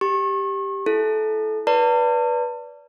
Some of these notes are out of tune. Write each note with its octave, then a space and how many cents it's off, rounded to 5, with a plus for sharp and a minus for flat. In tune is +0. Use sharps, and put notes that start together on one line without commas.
G4 +0 C#6 -40
E4 +0 A4 -25
B4 -10 D5 -25 A5 +40